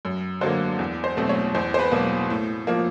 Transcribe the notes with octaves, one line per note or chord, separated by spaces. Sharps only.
F#2
D3 F#3 A#3 C5
E2
C5
B2 F#3 A3 C4
C#5
E2 C5
C5
B4
B2 F#3 A#3
A2
F3 A#3